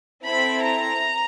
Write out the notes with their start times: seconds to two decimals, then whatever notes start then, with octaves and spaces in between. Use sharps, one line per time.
0.24 C4 E4 A4 B5
0.63 A#5